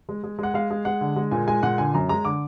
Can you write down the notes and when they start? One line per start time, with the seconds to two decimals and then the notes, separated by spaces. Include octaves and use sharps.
0.09 G#3
0.24 G#3
0.39 G#3 F#5
0.54 G#3 F5
0.70 G#3
0.85 G#3 F#5
1.01 D3
1.16 G#3
1.31 A#2 G#5
1.47 G#3 G#5
1.63 A#2 F#5
1.78 D3 G#5
1.94 F#2 A#5
2.09 G#3 A#5
2.25 D3 D6